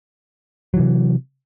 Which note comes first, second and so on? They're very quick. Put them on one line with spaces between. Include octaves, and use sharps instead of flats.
F#3 E3 C3